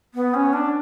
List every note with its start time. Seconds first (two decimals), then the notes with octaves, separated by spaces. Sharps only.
0.14 B3
0.34 C#4
0.53 D4